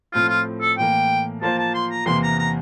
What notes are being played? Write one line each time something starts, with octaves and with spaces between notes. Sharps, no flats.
A2 F3 C4 F4
F4
A4
A2 E3 A#3 G5
F3 A#3 F4 C5 A5
A5
C6
A#5
E2 C3 E3 A#3 C6
A#5
A#5